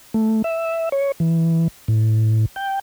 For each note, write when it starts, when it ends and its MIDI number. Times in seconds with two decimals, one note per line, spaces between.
0.14 0.42 57
0.44 0.89 76
0.92 1.12 73
1.20 1.68 52
1.88 2.45 45
2.56 2.79 79